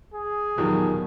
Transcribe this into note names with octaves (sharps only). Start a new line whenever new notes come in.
G#4
E2 B2 D#3 F3 F#3 G4 A#4 A5